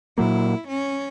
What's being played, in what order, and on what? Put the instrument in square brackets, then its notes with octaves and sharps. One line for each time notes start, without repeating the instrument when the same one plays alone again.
[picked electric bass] A#2 F#3 A#3 [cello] E4
[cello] C#4